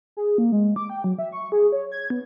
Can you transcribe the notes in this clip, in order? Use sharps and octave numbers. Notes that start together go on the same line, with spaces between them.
G#4
A#3
G#3
D6
G5
F#3
E5
C#6
G#4
C#5
G#6
B3